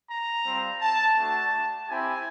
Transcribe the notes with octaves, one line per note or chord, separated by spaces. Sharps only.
A#5
G3 C4 F4
A5
A3 D4 F#4 A5
C4 E4 G4 G#5